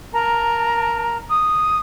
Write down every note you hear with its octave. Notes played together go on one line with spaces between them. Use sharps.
A#4 A5 A#5
D#6